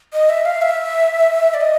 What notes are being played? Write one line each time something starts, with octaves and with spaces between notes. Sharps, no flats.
D#5
E5
F5
E5
D5
D#5